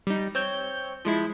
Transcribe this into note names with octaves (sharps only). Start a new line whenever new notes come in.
G3 D#4
C4 C#5 G6
F3 G#3 E4